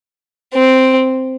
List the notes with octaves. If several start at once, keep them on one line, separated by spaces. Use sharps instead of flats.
C4